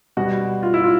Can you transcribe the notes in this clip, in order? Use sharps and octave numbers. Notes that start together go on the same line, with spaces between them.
B2 G3 F#4
F4
E4
F4